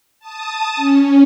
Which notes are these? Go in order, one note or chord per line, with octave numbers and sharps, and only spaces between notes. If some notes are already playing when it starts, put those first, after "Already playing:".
A5 D#6
C#4